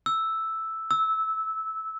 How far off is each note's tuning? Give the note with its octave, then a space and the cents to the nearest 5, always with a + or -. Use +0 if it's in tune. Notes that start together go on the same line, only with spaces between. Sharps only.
E6 +0
E6 -15